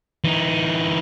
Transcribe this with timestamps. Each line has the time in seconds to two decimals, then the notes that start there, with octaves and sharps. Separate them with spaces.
0.24 E3 D#4